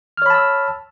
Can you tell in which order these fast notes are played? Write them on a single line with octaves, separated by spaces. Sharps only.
F6 C#5 B5 A5 E6